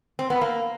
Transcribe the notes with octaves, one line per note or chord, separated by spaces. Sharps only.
C4
B3
A#3